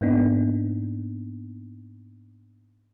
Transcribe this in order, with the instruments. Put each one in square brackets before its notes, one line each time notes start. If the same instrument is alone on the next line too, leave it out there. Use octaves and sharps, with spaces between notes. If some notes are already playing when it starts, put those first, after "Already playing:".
[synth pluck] G#2 A#3 B3 D4 D#4